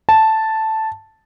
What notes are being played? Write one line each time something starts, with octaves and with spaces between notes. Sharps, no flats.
A5